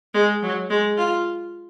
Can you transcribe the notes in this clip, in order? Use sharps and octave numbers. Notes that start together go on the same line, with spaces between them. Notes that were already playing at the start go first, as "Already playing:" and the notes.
G#3
F#3
G#3
F4